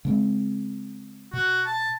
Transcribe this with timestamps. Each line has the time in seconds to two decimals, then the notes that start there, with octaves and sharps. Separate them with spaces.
0.05 C#3 G#3 C4
1.33 B2 F#4
1.66 A5